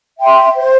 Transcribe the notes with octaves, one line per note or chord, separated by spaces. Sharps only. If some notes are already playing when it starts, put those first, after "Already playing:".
E5 G5 C6
C5